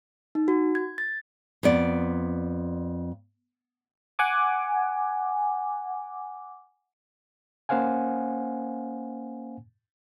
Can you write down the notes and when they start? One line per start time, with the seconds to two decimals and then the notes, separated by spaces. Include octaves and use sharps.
0.35 D#4
0.48 F#4
0.75 G#6
0.98 A6
1.63 F2 B3 D5
4.19 F#5 G#5 D6
7.69 A#3 C#4 C5 F5 F#5 G#5